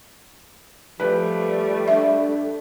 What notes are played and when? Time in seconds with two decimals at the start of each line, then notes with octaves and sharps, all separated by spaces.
1.00 F3 G3 A3 B4
1.88 D4 A4 E5